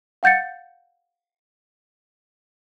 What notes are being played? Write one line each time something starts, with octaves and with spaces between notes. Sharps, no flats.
F5 F#5 G6 A6 C#7